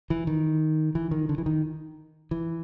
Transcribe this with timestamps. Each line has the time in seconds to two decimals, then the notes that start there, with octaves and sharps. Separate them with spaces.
0.10 E3
0.27 D#3
0.95 E3
1.11 D#3
1.29 D3
1.38 E3
1.46 D#3
2.31 E3